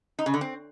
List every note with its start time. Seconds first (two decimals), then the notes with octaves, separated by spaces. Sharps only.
0.19 D#4
0.26 C#3
0.34 D3
0.41 C4